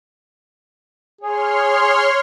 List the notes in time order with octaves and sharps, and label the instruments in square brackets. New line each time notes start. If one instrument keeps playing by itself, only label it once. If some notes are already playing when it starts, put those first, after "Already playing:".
[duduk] G#4 [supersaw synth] C#5 C6 F6